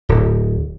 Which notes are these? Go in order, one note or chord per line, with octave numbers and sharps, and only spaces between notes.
D1